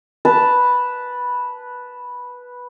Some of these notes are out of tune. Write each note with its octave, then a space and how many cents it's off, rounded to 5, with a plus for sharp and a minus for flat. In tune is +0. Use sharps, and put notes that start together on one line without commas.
B4 -5 A5 +0